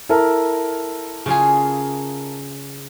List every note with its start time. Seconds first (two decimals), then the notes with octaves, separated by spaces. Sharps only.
0.09 E4 A4 A#4
1.26 C#3 F4 G#4